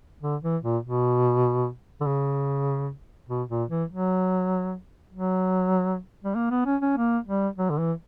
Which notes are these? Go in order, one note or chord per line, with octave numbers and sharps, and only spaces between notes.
D3
E3
A#2
B2
D3
C#3
B2
A#2
E3
F#3
F#3
G3
A#3
B3
C#4
C#4
A#3
G3
F#3
D3
E3